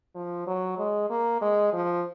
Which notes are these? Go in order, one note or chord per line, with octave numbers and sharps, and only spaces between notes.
F3
F#3
G#3
A#3
G#3
F3